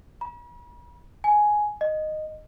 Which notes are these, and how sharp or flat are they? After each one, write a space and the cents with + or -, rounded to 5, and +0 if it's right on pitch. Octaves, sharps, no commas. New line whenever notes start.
B5 -45
G#5 +10
D#5 -10